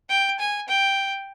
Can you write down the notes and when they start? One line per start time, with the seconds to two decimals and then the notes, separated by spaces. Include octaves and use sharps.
0.09 G5
0.40 G#5
0.69 G5